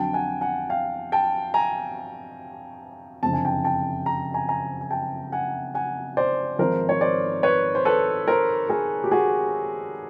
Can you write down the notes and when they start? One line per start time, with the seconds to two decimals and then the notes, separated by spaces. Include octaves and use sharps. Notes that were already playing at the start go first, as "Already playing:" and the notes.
Already playing: F2 D3 F#3 G5 A5
0.13 F#5 G#5
0.41 F#5 G#5
0.70 F5 G5
1.12 G5 A5
1.54 G#5 A#5
3.23 F#1 F2 D3 F3 A5
3.33 G#5
3.45 G5 A5
3.64 G5 A5
4.06 A#5
4.34 G#5 A#5
4.49 G#5 A#5
4.81 G#5
4.91 G5 A5
5.32 F#5 G#5
5.75 F#5 G#5
6.17 C5 D5
6.59 G#1 G#2 F3 A#4 C5
6.89 C#5
7.01 C5 D5
7.43 B4 C#5
7.75 C5
7.85 A4 B4
8.28 A#4 C5
8.69 G#4 A#4
9.04 G4
9.12 F#4 G#4